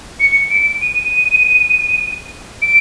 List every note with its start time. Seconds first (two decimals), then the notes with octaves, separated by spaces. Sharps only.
0.20 C#7
0.50 D7
0.81 D#7
2.62 D7